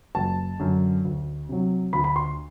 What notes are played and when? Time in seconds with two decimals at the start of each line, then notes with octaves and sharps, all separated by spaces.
0.15 F#1 A5
0.59 F#2 D3
1.05 D2
1.49 C3 F#3
1.93 D2 B5
2.04 B5
2.16 C6